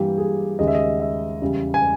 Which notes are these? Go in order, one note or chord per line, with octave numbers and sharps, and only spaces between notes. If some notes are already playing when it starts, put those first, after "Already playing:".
Already playing: G2 E3 A#3 G4
G#4
D#2 C#3 G#3 D#5
E5
D#5
E5
E2 C#3 G3
G#5